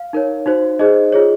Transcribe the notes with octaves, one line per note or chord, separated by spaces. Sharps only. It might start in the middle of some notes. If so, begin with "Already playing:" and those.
Already playing: F5
D#4 A#4 C#5
D#4 F#4 C5
D#4 G#4 C5 D#5
F4 G#4 C#5